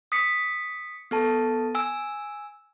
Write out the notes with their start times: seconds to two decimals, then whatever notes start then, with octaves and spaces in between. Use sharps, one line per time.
0.12 D#6 B6 C#7
1.11 B3 A4 A5
1.75 G#5 E6